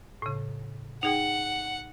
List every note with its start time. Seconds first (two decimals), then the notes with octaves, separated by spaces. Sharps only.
0.22 A2 C#3
1.03 D#4 G#4 F#5 G5